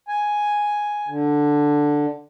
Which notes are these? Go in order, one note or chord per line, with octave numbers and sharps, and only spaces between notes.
G#5
D3